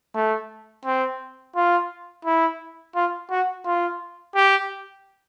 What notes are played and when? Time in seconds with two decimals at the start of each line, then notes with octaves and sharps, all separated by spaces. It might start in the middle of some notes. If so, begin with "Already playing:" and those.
0.15 A3
0.85 C4
1.56 F4
2.25 E4
2.95 F4
3.31 F#4
3.66 F4
4.35 G4